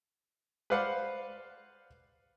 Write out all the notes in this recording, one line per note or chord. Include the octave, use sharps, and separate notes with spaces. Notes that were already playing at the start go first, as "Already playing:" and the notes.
B4 C5 D5 F5 F#5